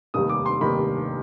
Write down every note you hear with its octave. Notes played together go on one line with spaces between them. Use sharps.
F1 D#2 D#3 G3 D#6
D6
C6
F1 D#2 D#3 G3 B5